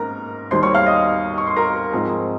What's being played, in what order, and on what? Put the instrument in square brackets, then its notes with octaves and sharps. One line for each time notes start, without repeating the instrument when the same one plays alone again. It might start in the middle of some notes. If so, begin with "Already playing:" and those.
Already playing: [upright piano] G#2 D#3 A#3 C#4 A#4 A#5
D#2 D#3 G3 C5 C6
C#5 C#6
F5 F6
D#5 D#6
C#6
C6
A#4 A#5
G#2 F3 G#3 C4